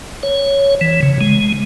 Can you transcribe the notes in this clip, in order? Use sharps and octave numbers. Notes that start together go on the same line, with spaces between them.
C#5
E3
C#3
G#3